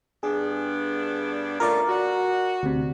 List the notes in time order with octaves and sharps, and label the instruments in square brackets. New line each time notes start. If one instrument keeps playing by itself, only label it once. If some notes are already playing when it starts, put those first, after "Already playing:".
[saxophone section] G2 B3 D4 [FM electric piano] G#4
[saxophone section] A3 C#4 F4 [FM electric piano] A#4 D5
[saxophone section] F#4
[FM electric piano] D2 C3